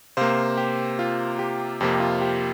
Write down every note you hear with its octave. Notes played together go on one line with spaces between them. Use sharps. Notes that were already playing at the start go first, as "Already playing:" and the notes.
C3 A#3 C5 F5
G4
F4
G4
F2 C3 A#3 G4
F4
G4